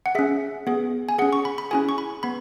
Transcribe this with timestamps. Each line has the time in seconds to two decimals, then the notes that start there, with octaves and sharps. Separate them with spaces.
0.06 F#5
0.15 C#4 G#4 E5
0.67 B3 G#4
1.09 G#5
1.18 G#4 F#5
1.22 C#4
1.33 C#6
1.45 B5
1.58 B5
1.71 C#4 E4 G#4 G#5
1.89 C#6
1.98 B5
2.23 B3 B5